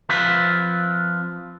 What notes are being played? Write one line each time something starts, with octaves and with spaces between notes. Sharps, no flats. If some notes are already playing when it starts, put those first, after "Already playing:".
F3 C4 F4 B4 E5